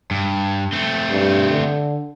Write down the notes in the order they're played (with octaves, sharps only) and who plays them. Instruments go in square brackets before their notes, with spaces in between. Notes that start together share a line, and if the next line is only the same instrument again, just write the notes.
[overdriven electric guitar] G2
A3 C4
[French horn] G2
D3